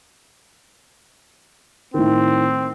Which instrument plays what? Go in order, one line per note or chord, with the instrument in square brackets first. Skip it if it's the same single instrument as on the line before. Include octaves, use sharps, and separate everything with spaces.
[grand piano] A2 D#3 [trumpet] C4